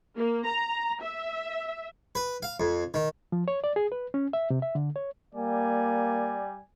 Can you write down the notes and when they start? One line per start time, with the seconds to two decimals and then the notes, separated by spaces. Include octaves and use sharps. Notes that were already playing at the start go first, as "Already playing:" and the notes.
0.16 A#3
0.46 A#5
1.02 E5
2.15 B4
2.43 F5
2.60 F2
2.94 D#3
3.32 F3
3.48 C#5
3.64 D5
3.76 G#4
3.92 B4
4.14 C#4
4.33 E5
4.50 C3
4.62 E5
4.75 D3
4.96 C#5
5.35 G3 A#3 D5 G#5